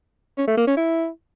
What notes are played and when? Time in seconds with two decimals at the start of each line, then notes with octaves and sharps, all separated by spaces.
0.38 C#4
0.47 A3
0.57 A#3
0.67 C#4
0.77 E4